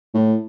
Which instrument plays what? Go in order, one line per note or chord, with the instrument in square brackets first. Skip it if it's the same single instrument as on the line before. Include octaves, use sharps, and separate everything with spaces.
[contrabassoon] A2